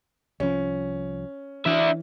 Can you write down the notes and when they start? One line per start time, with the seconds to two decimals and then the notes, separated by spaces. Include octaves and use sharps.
0.40 C2 F3 C#4
1.66 E3 D4 E5